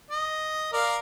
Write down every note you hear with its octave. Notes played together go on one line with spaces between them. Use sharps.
D#5
A#4 D5 F5